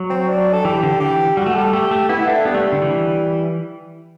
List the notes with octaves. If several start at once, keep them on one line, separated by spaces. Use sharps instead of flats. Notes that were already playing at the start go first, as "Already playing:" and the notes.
Already playing: F#3
C4
D4
A4
E3 G4
D3
E3 G4
G3 F#4
A3
G3 A4
A3 G4
A3
B3 E4
A3 D4
G3 B3
A3
D3
E3